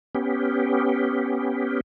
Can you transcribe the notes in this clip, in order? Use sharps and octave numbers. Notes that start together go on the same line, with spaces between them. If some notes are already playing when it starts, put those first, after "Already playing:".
B3 C#4 G4